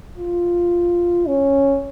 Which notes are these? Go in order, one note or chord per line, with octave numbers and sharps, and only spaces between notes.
F4
C#4